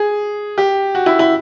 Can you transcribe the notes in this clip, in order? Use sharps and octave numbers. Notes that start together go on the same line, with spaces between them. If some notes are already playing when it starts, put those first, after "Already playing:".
Already playing: G#4
G4
F#4
E4
E4